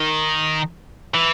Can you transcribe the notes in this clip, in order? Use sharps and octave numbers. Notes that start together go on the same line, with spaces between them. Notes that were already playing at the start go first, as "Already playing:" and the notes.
Already playing: D#3
E3